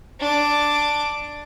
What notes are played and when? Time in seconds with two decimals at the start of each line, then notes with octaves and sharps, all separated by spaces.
0.20 D4 D6